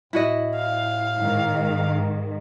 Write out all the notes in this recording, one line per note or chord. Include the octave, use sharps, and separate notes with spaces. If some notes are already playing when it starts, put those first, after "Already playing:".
A2 E4 F#4 D#5
F5
G#2 D#3